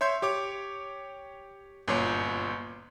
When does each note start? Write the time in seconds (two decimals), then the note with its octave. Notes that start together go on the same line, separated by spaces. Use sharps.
0.01 C#5 E5 C6 G6
0.22 G4 C#5 D6
1.88 G1 F#2 A#2 C#5